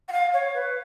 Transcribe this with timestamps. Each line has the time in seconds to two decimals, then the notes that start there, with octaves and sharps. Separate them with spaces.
0.08 F#5
0.12 F5
0.34 C#5
0.54 B4